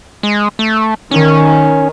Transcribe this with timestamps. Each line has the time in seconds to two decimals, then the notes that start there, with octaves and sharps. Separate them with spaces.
0.23 G#3
0.59 A3
1.11 D#3 C#4